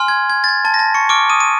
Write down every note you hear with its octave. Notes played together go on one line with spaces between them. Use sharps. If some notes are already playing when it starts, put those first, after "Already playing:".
Already playing: G#5 C6 F6
G#6
G#6
A6
G#6
A5 A6
A#6
A5 A6
C#6 C#7
C#6 D6 F6 D7
D#6 D#7
D#7